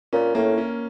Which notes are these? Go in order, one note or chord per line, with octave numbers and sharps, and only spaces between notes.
A#2 C#4
A2 A#3
C#4